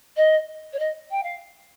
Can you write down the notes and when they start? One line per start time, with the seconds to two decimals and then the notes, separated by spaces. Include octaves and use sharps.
0.16 D#5
0.73 C#5
0.79 D#5
1.11 G5
1.23 F5